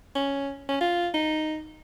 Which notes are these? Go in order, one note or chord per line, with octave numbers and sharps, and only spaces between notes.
C#4
C#4
F4
D#4